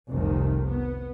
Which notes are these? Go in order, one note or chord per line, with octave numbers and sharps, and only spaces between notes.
F1 C2 D#3
B3